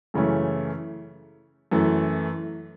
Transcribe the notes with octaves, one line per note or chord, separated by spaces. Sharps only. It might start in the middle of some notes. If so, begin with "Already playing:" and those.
F#2 C#3 E3 A3 C#4
F#2 E3 A3